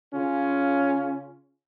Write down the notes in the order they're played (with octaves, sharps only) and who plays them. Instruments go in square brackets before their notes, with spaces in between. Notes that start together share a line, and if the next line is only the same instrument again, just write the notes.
[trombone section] C#3 C#4 F4